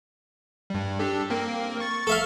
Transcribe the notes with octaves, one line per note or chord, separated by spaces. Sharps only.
G2 G3
D4 G4 A4
A#3 C4 A#4
C#6 A6 C#7
A4 E5 F5